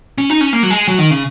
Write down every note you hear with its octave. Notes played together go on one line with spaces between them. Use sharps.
C#4
D#4
C#4
A#3
F#3
G#3
F#3
D#3
C#3